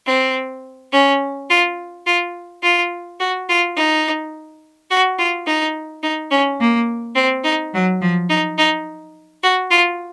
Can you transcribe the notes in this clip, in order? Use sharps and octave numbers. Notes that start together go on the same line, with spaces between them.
C4
C#4
F4
F4
F4
F#4
F4
D#4
F#4
F4
D#4
D#4
C#4
A#3
C4
D#4
F#3
F3
D#4
D#4
F#4
F4